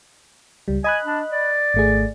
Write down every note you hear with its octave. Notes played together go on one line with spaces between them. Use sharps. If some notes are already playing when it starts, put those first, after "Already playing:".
C#2 G3
D#5 G#5 B5 F#6
D4
D5
G#1 A3 G#4